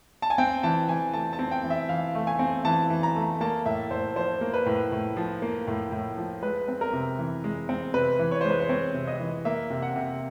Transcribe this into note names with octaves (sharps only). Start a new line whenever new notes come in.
A5
G#5
C4 G5
E3 A5
E3 G#5
A3 A5
A5
C4
G5
E3
E5
E3 F5
A3
G#5
C4
E3 A5
E3
A#5
A3
A#3 A5
A2 E5
A2 C5
F3 C5
A#3
B4
A2
A2
F3
A#3
A2
A2
F3
G#3 B4
C4
A#4
C3
E3
G#3
C4
C3 B4
E3
C#5
G#3 C5
B4
C5
C4 C#5
C3
D#5
E3
A#3 E5
C3
F#5
C3